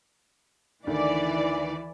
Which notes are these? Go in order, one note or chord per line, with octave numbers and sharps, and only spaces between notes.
D2 D#3 E3 D5